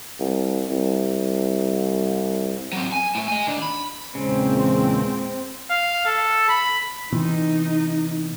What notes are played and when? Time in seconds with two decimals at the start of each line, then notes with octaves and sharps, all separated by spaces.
0.20 C2
0.69 C2
2.73 F#3 C4
2.92 G#5
3.15 A2 A3
3.28 D#5 G#5
3.47 D#3 D4
3.62 B5
4.15 E2 A#2 C#3 G#3 C4
5.70 F5
6.06 A4
6.49 B5
7.13 C3 E3 B3 D#4